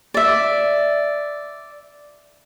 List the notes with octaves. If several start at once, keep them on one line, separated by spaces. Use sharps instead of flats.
D5 E5